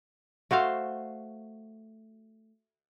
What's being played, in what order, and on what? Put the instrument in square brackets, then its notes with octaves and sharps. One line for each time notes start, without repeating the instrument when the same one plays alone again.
[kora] A3 F#4 C5 F5